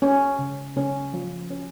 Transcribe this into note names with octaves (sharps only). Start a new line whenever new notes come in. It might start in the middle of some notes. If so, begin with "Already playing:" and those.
C#4
C#3
C#3 C#4
F3
C#4